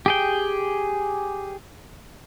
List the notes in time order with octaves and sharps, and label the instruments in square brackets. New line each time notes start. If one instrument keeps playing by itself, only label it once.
[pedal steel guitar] G4 G#4 G5